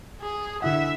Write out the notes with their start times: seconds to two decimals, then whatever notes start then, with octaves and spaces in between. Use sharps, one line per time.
0.21 G#4
0.62 D3 E4 E5 F#5